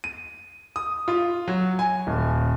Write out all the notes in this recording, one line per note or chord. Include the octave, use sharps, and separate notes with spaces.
D#7
D#6
F4
F#3
G#5
D#1